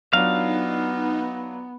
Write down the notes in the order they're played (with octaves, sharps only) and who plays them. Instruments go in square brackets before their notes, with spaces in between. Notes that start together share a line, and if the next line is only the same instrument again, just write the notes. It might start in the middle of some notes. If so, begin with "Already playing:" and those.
[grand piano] F#3 D4 F4 [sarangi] B3 [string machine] D#4 [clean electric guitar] F5